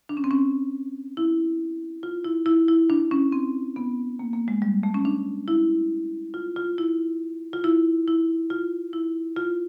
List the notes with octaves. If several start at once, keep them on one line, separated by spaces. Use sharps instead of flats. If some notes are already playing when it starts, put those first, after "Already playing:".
D4
C#4
C4
C#4
E4
F4
E4
E4
E4
D4
C#4
C4
B3
A#3
A#3
G#3
G3
A3
C#4
D4
E4
F4
F4
E4
F4
E4
E4
F4
E4
F4